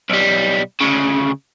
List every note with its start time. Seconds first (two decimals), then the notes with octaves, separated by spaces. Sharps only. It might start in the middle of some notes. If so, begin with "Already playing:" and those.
0.10 B1 G3
0.80 D2 C#3